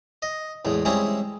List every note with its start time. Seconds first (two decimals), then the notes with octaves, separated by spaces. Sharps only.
0.22 D#5
0.65 E2 A2 G#3
0.85 G3 G#3 C4 C#4 E4 G#4